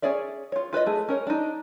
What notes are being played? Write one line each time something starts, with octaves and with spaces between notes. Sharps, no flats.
C#4 G#4 C#5 D5 E5
F4 C#5
F4 B4 C5 D#5
A3 G#4
C#4 A#4 C#5
D4 D#4